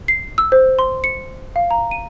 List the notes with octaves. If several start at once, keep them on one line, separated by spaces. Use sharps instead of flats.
C7
E6
C5
C6
C#7
F5
A#5
D#7